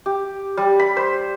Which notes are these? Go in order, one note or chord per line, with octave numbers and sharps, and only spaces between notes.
G4
G3
B5
C5